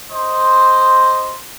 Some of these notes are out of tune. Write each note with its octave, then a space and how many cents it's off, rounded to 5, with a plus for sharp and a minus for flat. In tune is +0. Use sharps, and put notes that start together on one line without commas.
C5 +0 D#5 +0